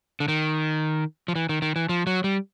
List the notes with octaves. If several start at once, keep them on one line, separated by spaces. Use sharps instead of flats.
D3
D#3
F3
E3
D#3
D#3
E3
F3
F#3
G3